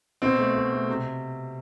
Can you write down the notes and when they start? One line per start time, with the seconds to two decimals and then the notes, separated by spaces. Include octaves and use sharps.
0.22 B2 C4
0.38 A3
0.55 B2
0.72 A3
0.89 C3